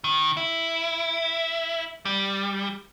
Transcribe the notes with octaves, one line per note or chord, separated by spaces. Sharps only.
D#3
E4
G3